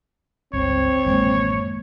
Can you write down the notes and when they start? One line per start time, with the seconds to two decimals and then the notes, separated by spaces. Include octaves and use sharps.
0.53 G1 C#2 G2 C4 C#5
1.05 A1 F#2 D#3 G#3 A#3